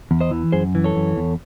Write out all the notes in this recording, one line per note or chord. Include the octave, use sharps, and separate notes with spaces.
E2
C5 D#5
E3
F#2 G#4 C5
E3
A4 C#5
F#2
E2